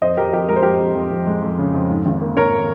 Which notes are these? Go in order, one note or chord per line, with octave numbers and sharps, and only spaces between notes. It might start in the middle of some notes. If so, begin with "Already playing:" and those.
F2 C5 D#5
F2 G4 A#4
F2 G4 A#4
G#3 A#4
C5
F2 G4 A#4
F2
F2
F2
G#3
F2
C#3
F2
G#2
G#1
A#3
G#1 A#4 C#5
A#3